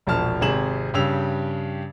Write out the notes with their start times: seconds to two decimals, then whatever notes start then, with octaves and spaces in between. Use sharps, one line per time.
0.07 E1 A#1 F3 A5 F6
0.41 G#1 C3 G#4 E7 F#7
0.94 G2 C#3 G4 E6 F7